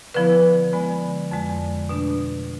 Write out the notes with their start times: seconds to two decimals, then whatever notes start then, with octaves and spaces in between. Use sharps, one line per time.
0.14 D3 F3 B3 E4 B4
0.73 D3 G#3 B3
1.31 F2 D3 G#3
1.89 B2 A3 D4